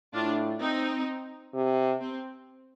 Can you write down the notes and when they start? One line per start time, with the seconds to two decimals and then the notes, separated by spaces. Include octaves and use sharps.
0.14 A2 D4 F4
0.60 C4 D#4
1.54 C3
2.00 C4